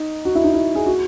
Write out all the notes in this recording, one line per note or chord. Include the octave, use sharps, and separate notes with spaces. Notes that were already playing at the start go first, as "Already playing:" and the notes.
Already playing: D#4
F#4
E4
D#4
E4
G#4
F#4